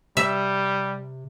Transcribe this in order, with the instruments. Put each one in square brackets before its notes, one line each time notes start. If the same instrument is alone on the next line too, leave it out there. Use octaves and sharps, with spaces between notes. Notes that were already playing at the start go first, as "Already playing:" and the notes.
[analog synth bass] C3 [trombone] G3 [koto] E5